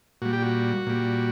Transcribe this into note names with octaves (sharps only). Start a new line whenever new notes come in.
A#2 G3 F#4
G4
F#4
A#2 G3